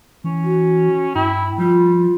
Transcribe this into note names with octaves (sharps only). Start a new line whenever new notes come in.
E3 C#4
F#4
G2 E4 G5
F3 G3 F4